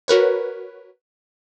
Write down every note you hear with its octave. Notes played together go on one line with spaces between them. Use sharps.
F#4 A#4 B4 C#5